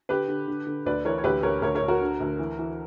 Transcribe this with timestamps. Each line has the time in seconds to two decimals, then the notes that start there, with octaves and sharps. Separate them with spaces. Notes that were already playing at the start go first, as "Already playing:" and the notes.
0.09 D3 G4 B4
0.28 D3
0.48 D3
0.67 D3
0.86 D2 B4 D5
1.05 E3 A#4 C#5
1.18 C#5
1.24 D2 G4 B4
1.43 D2 A#4 C#5
1.62 D2 A#4 C#5
1.75 A#4 C#5
1.82 D2
1.88 F#4 A#4
2.01 D3
2.20 D2
2.39 E3
2.59 E3